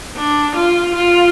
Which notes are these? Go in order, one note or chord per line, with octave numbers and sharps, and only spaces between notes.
D4
F4
F4